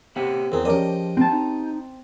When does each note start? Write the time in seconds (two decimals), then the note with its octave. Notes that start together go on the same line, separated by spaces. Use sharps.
0.16 C3 A#3 G4 F#5
0.52 E2 E3 C4 G#4 A#4 C5
0.65 F3 C#4 G4 A#4 D5 D#5
1.17 C4 A5
1.32 D#4